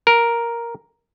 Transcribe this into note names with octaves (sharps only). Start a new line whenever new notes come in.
A#4